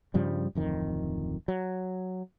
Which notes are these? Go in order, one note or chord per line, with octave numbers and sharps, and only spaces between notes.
G2 C#3 F3 G3
D1 F2 D#3
F#3